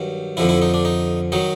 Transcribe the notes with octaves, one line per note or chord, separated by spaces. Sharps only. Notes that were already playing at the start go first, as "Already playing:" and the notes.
Already playing: G2 D#3 F#3
F2 D3 F3 E4
E4
D#4
D4
D#4
D#3 F#3 D#4